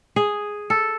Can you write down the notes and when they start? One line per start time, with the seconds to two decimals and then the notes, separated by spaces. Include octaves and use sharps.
0.16 G#4
0.70 A4